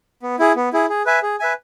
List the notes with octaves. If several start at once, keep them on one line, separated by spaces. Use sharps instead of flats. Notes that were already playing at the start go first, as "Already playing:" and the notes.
B3
E4 G#4
B3
E4 G#4
G#4
B4 E5 G#5
G#4
B4 E5 G#5